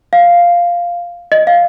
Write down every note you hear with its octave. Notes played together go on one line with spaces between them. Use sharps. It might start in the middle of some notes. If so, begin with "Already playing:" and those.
F5
D#5
F5